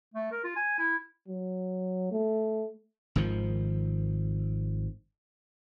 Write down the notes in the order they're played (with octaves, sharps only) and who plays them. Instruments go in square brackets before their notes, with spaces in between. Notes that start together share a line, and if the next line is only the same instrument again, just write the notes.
[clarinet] A3
A#4
F4
G#5
E4
[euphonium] F#3
A3
[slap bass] G#1 G#2 D#3 F3